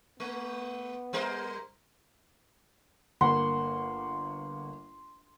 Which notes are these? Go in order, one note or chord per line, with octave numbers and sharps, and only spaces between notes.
A3 B3
G3 A#4 C5
G1 A#3 F#5 C6